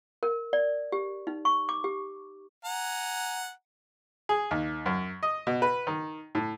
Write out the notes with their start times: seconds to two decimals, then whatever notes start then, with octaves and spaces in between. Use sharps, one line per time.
0.23 A#4
0.53 D5
0.92 G4
1.27 D#4
1.45 C#6
1.69 D6
1.84 G4
2.65 F#5 G#5 A#5
4.29 G#4
4.51 D#2
4.86 F#2
5.23 D#5
5.47 B2
5.62 B4
5.87 D#3
6.35 A2